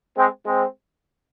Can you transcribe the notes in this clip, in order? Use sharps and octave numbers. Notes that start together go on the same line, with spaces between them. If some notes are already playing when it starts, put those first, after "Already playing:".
G#3 C4
G#3 C4